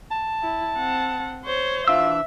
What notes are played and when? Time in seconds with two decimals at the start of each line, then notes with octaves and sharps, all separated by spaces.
0.11 A5
0.43 E4
0.76 C4 F#5
1.44 C5 C#5
1.88 E3 D4 F4 E5 E6